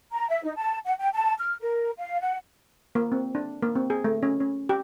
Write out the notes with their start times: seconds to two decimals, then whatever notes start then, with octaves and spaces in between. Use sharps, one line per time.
0.11 A#5
0.29 E5
0.44 D#4
0.57 A5
0.86 F#5
0.99 G5
1.14 A5
1.39 F6
1.61 A#4
1.97 F5
2.21 F#5
2.95 A#3
3.12 C4
3.35 D4
3.62 A#3
3.75 C4
3.90 G#4
4.04 A3
4.23 C#4
4.40 C#4
4.69 G4